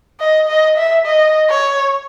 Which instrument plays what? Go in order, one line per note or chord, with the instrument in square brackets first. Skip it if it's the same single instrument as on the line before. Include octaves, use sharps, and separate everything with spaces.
[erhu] D#5
D#5
E5
D#5
C#5